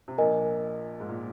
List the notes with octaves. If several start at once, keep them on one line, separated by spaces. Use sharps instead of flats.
C3
A#1 A#2 A#4 D#5 G#5
G#2
A#2